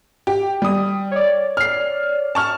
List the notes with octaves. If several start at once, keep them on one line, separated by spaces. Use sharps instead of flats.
G4
G3 D#6
C#5 D5
F6 C7
A5 C#6 F6